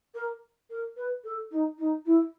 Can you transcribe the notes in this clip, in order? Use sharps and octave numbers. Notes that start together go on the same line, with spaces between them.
A#4
A#4
B4
A4
D#4
D#4
E4